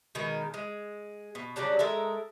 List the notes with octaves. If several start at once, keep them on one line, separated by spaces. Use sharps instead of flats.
B2 D#3 G#3 D#4
G#3
B2
C#3 F#3 G3 D4
G#3 A4 A#4 E5